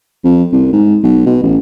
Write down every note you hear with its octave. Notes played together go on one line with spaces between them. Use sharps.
F2
C2
G#2
B1
B2
A1